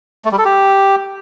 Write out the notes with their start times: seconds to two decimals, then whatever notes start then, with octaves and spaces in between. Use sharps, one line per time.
0.25 A3
0.32 G3
0.38 A4
0.45 G4